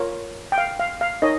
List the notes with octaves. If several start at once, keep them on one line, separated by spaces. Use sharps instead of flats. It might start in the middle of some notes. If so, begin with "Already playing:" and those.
Already playing: F4 A#4 C#5
G5
F5
F5
F5
D#4 A#4 C#5 D#5